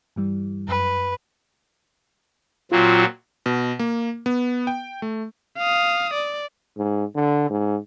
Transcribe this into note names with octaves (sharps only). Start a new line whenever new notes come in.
G2 E3 G3
F#2 B4
A#2 F#3 C4 F4
B2
A#3
B3
G5
A3
F5 D#6
D5
G#2
D3
G#2